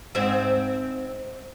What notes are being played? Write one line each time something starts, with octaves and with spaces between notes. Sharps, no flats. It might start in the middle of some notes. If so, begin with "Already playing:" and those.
G#2 C4 E5